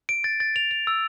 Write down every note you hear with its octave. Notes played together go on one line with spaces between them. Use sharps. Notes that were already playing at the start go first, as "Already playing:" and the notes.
D7
A6
A6
F7
F7
E6